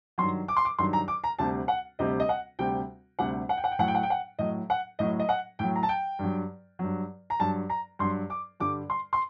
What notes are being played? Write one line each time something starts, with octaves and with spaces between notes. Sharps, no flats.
G2 D#3 F#3 C6
D6
C6
D6
G2 D#3 F#3 C6
A#5
D6
A#5
D2 C3 G3 A5
F#5
D2 C3 G3 D#5
D#5
F#5
D2 C3 G3 G5
D2 C3 G3 F#5
F#5
G5
F#5
G5
A2 F#3 F#5
G5
F#5
G5
F#5
A2 F#3 D#5
F#5
A2 F#3 D#5
D#5
F#5
A2 F#3 G5
A#5
A5
G5
G2 F#3
G2 F#3
A#5
G2 F#3 A5
A#5
G2 F#3 C6
D6
G2 D3 G3 D6
C6
C6